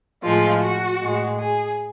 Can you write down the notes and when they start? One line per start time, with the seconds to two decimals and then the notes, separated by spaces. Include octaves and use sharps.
0.22 A2 F3 G#3 F4
0.61 F#4
1.00 A2 G#3
1.39 G#4